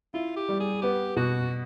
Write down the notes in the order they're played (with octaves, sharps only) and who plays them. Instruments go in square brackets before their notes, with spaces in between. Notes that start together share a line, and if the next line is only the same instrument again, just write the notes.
[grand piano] E4 [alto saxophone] F4
[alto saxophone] G4
[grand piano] G3
[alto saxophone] G#4
[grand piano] B3 [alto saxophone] G4
[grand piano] B2 [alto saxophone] F#4